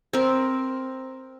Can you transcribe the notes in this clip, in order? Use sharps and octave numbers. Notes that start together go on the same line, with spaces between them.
C4 A#4